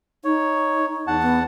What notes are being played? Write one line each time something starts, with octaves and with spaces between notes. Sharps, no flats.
D#4 C#5
E2 F#5 A5
B3